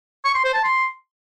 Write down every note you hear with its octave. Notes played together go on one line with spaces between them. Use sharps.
C#6
C6
C5
A5
C6